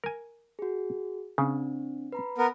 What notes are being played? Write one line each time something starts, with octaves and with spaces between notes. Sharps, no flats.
A#4 G#5
F#4 G#4
C#3 C4 D4
B4 A#5 B5
B3 A#4